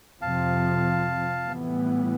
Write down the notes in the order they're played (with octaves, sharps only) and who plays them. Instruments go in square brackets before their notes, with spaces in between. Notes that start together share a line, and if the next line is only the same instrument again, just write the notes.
[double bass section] F2 C3 F3 [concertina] F5 A5
[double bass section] A2 E3 G3 B3